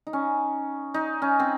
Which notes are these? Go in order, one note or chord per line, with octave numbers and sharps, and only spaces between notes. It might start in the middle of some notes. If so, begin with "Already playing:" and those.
D#4
C#4
D#4
C#4
C4